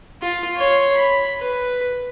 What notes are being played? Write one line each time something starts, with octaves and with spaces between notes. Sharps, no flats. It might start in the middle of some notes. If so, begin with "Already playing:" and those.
F4
C#5 C6
B5
B4